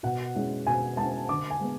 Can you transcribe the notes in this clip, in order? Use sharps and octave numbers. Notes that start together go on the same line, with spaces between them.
B2 F#5
G#3 C#4 E4
B2 G#5
G#3 C#4 E4 A5
D3 D6
G#5
G#3 B3